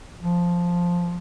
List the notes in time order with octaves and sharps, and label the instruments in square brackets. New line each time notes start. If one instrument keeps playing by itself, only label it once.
[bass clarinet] F3